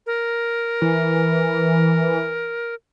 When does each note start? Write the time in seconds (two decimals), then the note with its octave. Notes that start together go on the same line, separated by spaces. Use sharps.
0.06 A#4
0.82 E3